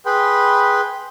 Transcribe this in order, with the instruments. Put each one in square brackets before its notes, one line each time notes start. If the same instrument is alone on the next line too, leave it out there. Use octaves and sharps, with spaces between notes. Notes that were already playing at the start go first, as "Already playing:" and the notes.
[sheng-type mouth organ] G#4 B4 G5 B5 C6